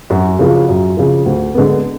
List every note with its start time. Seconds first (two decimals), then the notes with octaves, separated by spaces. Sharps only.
0.10 F#2 F#4
0.39 C#3 F3
0.68 F#2
0.97 C#3 F3
1.26 D2
1.55 D3 G#3 B3